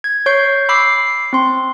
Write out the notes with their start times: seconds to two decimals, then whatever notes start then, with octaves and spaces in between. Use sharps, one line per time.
0.04 G#6
0.26 C#5 C#6 G6 C7
0.69 B5 D6 E6 C7
1.33 C4 C6